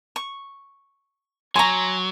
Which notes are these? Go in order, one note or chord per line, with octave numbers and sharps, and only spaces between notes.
C#6
F#3 G#5 A#5 C6 C#6